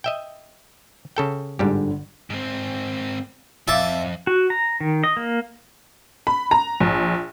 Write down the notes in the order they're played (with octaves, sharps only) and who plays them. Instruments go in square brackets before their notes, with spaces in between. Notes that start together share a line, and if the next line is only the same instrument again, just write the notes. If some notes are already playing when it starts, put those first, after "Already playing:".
[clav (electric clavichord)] D#5 E5 G5
C#3 A4 G5
[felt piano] G1 D3 [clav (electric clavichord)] G#2 G3 G4
[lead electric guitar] G#2 C4
[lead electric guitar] F2 [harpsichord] E5 A5 [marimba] F5 D6 E6
[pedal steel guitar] F#4
A#5
D#3
D#5
A#3
[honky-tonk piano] B5
A#5
A#1